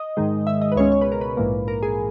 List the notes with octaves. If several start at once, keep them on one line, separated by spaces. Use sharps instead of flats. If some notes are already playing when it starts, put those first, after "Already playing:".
Already playing: D#5
G#2 D#3 G#3
E5
D#5
B4
C#2 B2 G#3 C#4 C#5
C#5
B4
A#4
B4
A#1 G#2 E3 A#3
A#4
G#4